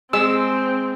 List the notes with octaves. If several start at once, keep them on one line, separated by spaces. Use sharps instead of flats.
G#3 C4 E6